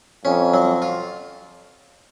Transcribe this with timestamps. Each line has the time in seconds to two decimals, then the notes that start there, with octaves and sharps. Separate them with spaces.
0.25 F2 C#4
0.54 F#3
0.82 F4